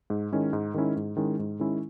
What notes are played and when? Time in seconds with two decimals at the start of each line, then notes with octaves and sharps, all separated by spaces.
0.10 G#2
0.32 D#3 G#3 C#4 E4
0.53 G#2
0.74 D#3 G#3 C#4 E4
0.96 G#2
1.17 D#3 G#3 C#4 E4
1.39 G#2
1.60 D#3 G#3 C#4 E4